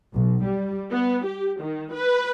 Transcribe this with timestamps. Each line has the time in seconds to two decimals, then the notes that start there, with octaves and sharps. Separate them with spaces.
0.14 B1
0.44 G3
0.91 B3
1.25 G4
1.61 D#3
1.93 B4